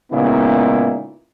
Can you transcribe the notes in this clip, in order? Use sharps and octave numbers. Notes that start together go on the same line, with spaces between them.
A#2 C#3 G#3 B3 D#4 E4